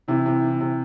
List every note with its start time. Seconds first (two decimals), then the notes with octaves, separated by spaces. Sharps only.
0.08 C3 E3 E4
0.26 C3
0.43 E3
0.61 C3